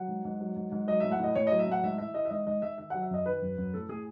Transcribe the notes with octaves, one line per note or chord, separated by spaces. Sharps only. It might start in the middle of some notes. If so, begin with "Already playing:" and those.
Already playing: F#3 F#5
G#2
G#2
F#3
G#2
G#2
F#3 D#5
A2 E5
F#5
A2 D#5
A2 C#5
F#3 D#5
E5
A2 F#5
G#2 E5
E3 E5
E3 D#5
E5
G#2 D#5
G#2 D#5
G#2 E5
D#3 E5
F#3 F#5
E5
F#2 D#5
D#3 B4
F#2
F#2
A2 A4
A2 G#4